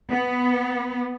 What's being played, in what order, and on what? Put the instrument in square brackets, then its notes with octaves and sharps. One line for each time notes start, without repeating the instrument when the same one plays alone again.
[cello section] B3